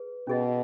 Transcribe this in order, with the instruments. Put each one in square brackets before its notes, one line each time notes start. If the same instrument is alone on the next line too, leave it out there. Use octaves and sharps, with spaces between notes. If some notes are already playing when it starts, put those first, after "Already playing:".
Already playing: [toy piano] G#4 B4
[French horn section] B2 [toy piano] C#4 G#4 D#5